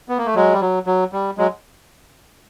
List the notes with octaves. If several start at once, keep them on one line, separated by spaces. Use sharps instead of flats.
B3
A#3
A3
F#3 G#3
G3
F#3
F#3
G3
F#3 G#3